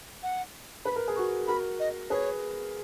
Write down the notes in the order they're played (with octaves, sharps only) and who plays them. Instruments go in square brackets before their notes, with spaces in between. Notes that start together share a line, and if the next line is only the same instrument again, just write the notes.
[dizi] F#5
[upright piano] B4 [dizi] B5
[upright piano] A#4
G#4
[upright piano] F#4 A#4 [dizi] C#6
[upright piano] F#4 A#4 [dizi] B5
[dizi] D#5
[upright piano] G#4 B4 [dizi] C#5